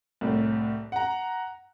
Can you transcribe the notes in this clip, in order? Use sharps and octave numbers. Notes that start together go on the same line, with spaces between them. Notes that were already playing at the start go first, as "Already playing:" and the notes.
C2 A2
F#5 A#5